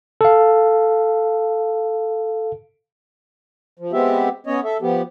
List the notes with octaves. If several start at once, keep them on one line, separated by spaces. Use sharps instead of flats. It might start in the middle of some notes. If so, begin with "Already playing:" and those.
A4 F5
F3
G#3 B3 C4 G4 E5
B3 C#4 C#5 D#5
A4 E5
F3 B3 G4